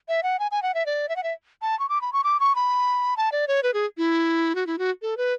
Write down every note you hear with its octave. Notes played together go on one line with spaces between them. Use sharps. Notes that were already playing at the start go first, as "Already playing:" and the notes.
E5
F#5
G#5
G#5
F#5
E5
D5
E5
F#5
E5
A5
C#6
D6
B5
C#6
D6
C#6
B5
A5
D5
C#5
B4
G#4
E4
F#4
E4
F#4
A4
B4